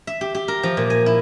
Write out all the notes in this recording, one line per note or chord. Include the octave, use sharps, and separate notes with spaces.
E5
G4
G4
A#4
F3
A#2
G#5
E4